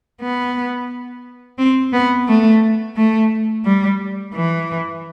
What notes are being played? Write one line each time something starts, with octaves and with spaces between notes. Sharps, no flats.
B3
C4
B3
A3
A3
G3
E3